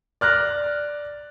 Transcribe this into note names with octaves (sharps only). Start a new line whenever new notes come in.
D5 F6 F#6 A#6